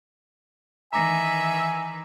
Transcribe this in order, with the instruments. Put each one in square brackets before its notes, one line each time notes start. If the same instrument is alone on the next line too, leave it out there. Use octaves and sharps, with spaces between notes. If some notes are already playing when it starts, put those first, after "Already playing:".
[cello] D#3 E3 [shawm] E5 [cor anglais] G#5 [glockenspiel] A#5 D6 A#6